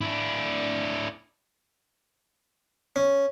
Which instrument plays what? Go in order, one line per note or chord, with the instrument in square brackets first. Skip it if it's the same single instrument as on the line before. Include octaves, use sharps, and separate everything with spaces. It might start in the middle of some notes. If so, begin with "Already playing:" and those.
[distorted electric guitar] D4 E4
[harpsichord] C#4